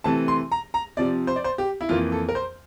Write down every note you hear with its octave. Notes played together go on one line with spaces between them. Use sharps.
C3 E3 A3 C4 A5
C6
A#5
A#5
C3 F3 C4 D5
C5
D5
C5
G4
E4
F2 E3 A#3 F4
A4
A#4
C5